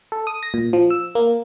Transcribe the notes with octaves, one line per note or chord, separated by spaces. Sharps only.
A4
D#6
A#6
A#2
F3
E6
A#3